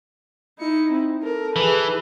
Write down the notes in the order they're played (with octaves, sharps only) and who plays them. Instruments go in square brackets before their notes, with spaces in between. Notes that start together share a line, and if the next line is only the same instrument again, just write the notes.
[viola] D#4 E4 [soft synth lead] C#7
[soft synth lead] C4
[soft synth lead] A4 [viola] A#4
[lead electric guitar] E3 [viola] G#4 B4